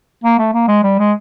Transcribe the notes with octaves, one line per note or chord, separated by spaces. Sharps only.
A#3
A3
A#3
G#3
G3
G#3